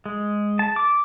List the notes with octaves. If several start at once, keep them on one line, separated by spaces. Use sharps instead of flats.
G#3
A5
D6